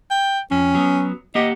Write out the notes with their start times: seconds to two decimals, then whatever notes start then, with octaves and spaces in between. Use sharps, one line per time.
0.11 G5
0.51 F2 C#4
0.75 F#3 B3
1.35 A#3 G4 D#5 F#5